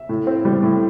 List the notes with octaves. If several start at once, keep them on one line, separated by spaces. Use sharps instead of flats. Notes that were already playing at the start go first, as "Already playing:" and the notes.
Already playing: E5
A2
C4
G3
A2